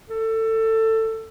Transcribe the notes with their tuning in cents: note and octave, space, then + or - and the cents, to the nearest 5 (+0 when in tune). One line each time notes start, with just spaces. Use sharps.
A4 +20